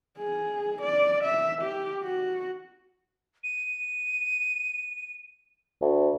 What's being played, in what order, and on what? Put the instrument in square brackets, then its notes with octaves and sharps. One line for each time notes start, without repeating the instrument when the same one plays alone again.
[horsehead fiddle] G#4
D5
E5
G4
F#4
[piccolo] D#7
[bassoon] D2